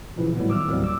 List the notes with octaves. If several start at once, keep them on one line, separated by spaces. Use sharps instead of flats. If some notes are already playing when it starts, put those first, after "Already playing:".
A#2 C#3 E3 F3
A2 F#3 G3 B3
D#3 D6 E6 F6
D#2 A2 F#3 G3 A#3 C4
D6 E6